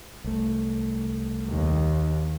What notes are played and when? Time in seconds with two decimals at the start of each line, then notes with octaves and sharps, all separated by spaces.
0.24 C2 A3
1.49 D#2